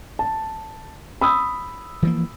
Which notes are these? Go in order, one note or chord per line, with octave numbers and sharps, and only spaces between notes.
A5
B5 D#6 E6
E3 F3 A#3